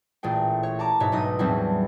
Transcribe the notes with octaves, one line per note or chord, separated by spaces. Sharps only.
A1 A#2 A3 G#4 G5
C#5
A5 A#5 D6
G#2 B2 C#5 E5
B1 G#2 D4 D#4 D#6
E2 A2 F#3 G3 C4 E4